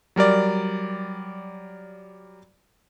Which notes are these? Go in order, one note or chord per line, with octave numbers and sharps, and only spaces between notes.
F#3 G3 A#4 D5